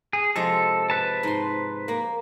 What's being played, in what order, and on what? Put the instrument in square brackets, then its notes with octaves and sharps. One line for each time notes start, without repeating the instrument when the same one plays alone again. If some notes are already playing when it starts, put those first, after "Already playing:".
[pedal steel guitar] G#4
[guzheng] C3 F3 G#3 [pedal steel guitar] A4
[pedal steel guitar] B4 A5
[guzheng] G#2 C6
A#3